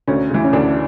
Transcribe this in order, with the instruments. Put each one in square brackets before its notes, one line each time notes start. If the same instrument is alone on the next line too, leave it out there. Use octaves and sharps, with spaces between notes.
[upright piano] D2 C#4
C#3 E3
C#4
D2 D4